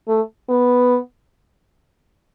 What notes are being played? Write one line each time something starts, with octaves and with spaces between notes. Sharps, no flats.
A3
B3